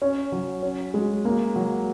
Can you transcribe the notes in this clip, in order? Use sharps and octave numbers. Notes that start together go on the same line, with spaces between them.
C#4
F#3
C#4
G#3
A#3
F#3